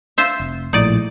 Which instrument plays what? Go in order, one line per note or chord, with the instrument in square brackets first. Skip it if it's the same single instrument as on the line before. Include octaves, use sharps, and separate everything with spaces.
[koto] F4 C5 E5
[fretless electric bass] F1
[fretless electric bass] A#1 A2 [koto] D#4 D5